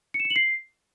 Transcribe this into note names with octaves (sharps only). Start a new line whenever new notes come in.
C#7
E7
C#7
F#7
C7